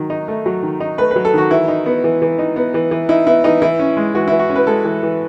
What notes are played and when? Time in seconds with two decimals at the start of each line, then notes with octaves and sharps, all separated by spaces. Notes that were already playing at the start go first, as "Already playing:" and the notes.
Already playing: D#3 F#3
0.10 D#4
0.28 A3
0.46 F#3
0.63 D#3
0.80 D#4
0.98 A3 B4
1.11 F#3 B4
1.25 A4
1.34 D#3 F#4
1.51 E3 E4
1.68 D#4
1.86 B3
2.04 E3
2.22 E3
2.39 D#4
2.56 B3
2.74 E3
2.91 E3
3.09 D#4 E4
3.27 B3 E4
3.44 E3 D#4
3.62 E3 E4
3.79 C#4
3.97 G#3
4.15 E3 F#4
4.28 E3 E4
4.39 F#4
4.50 C#4
4.55 B4
4.67 G#3 A4
4.85 E3
5.03 E3